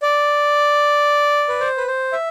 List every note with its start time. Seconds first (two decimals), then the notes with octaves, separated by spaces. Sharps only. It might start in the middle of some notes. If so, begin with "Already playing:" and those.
0.02 D5
1.48 B4
1.60 C5
1.78 B4
1.87 C5
2.13 E5